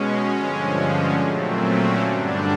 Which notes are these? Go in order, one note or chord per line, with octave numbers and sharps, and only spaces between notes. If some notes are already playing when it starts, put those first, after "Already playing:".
Already playing: B2 G#3 C#4
G2 D3 F3 G#3
A#2 F#3 A3 C4
C#4
G2 D3 G3 D4